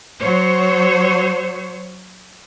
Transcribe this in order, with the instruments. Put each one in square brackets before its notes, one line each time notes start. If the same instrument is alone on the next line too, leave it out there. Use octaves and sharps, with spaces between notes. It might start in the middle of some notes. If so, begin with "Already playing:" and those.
[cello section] F#3 C5 C#5